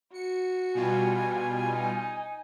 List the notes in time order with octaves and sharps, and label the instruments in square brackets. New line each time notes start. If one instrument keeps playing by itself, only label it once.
[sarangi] F#4 [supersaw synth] C#7
[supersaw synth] B2 G3 F4 [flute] G#5
[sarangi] D#4